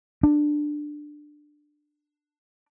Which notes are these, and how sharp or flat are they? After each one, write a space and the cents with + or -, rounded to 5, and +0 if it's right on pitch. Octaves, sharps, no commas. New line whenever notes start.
D4 +15